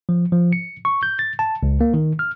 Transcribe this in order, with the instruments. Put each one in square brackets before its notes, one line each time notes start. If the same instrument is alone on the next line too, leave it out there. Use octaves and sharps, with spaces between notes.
[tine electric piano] F3
F3
C#7
C#6
G6
A6
A5
C#2
A#3
D#3
F6